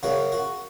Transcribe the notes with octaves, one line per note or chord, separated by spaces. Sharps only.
F#2 C#3 F#4
F#4